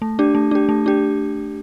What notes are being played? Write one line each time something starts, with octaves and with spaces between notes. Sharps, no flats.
A3
D4 G4
A3
D4 G4
A3
D4 G4